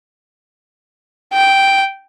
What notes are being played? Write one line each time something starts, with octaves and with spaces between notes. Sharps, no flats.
G5